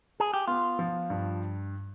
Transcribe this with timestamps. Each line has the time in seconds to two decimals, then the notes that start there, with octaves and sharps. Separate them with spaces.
0.20 G#4
0.34 G4
0.48 B3 F4
0.79 F3
1.10 G2